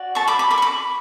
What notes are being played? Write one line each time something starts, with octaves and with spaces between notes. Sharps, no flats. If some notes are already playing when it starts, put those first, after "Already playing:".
Already playing: F#4 D5
A5 C#6
B5 D6
B5 D6
B5 D6
C#6
B5 D6